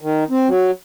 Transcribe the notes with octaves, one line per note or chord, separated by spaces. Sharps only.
D#3
C4
F#3